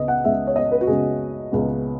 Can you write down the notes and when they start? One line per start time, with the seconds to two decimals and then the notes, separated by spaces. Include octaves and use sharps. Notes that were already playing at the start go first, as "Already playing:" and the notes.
Already playing: C#2 C#3 B3 D#5
0.08 F#5
0.24 C#2 C#3 G#3 B3 E5
0.47 C#5
0.56 D#5
0.72 B4
0.81 F#4
0.87 C#2 C#3 G#3 B3 G#4
1.52 C#2 C#3 G#3 B3